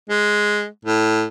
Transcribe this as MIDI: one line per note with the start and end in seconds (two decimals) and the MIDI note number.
0.09 0.67 56
0.85 1.24 45